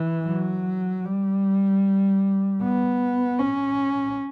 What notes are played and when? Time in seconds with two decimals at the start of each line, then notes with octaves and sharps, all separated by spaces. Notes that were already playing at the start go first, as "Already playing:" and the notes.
Already playing: E3
0.26 F#3
1.05 G3
2.62 B3
3.39 C#4